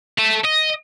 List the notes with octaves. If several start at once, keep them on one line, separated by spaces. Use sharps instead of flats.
A4 E5
D#5